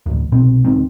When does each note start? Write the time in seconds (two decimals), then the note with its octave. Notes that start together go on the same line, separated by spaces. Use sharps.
0.06 A1 D2
0.32 C2 B2 C4
0.65 D1 C#2 D#3 C4